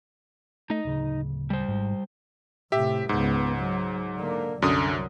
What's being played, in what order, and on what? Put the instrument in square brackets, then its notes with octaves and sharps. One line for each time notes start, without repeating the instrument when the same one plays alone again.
[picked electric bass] A3 [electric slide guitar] D#4 D#5
[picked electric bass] D1 C#3
[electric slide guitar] G3 C5
[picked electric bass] G#1 G#2
[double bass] A2 C3 [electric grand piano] G4 E5
[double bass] C#2 B3 [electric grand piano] G#2
[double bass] F#3
D3 A#3
[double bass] C2 F#3 [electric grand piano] F#2 D3 D#6